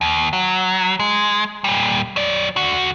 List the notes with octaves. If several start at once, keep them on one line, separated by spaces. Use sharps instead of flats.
D#2
F#3
G#3
A#2 G3
F#3 D5
D3 F#4